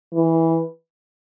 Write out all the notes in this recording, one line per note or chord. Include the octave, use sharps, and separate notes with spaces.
E3